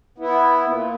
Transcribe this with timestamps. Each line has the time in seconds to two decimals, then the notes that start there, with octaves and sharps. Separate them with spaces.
0.18 B3 E4
0.65 A#2